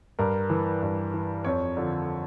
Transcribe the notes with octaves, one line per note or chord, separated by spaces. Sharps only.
G2 A#4
E3
G2
E3
F2 C#5
D3 F3